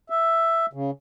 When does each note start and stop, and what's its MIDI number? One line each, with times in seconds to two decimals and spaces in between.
0.10 0.66 76
0.73 0.91 49